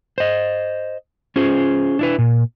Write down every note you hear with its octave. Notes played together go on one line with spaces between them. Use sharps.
C5 D#5
C#4 F4 G#4 C5
D4 E4 B4
A#2